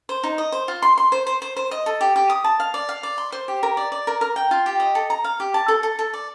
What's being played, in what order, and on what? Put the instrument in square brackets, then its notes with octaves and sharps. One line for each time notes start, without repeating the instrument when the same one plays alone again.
[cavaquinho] C5
D#4
D#5
C5
F4
C6
C6
C5
C5
C5
C5
D#5
A4
G4
G4
D#6
A5
F5
D5
F5
D5
C6
C5
G4
A#4
D5
D5
A#4
A#4
G5
F4
G4
D#5
A4
A#5
F5
G4
A5
A4
A4
A4
D5